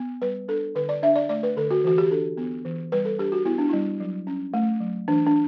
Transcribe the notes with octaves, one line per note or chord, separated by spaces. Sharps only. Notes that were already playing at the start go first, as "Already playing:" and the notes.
Already playing: B3
G3 B4
D4 A4
D3 B4
D5
D4 E5
D5
A3 D5
B4
D3 A4
F#4
E3 F#4
G4
D4 A4
B3
E3
G3 B4
A4
D4 G4
F#4
B3 E4
D4
G3 E4
F#3
C#4
A3
F#3
E3 D4
D4